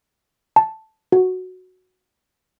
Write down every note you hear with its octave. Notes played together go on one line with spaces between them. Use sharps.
A5
F#4